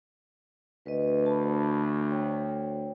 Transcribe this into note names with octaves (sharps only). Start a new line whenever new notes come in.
D2 B4 D#5
A5 B5
C#5 G5